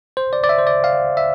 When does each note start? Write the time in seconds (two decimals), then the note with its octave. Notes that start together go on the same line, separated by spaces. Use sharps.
0.17 C5
0.33 D5
0.44 D5
0.49 E5
0.59 C5
0.67 D5
0.84 F5
1.17 E5